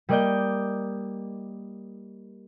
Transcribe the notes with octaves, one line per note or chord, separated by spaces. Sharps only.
G3 A#3 D5 D#5 D6 G6